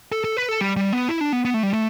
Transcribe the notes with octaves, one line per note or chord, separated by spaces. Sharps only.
A4
A4
B4
A4
G3
G3
B3
E4
D4
B3
B3
A3
G3
A3